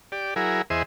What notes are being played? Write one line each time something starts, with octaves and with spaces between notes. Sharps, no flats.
G4 D5
F#3 E4 G#4 A#4
E2 G#4 C5 D#5 E5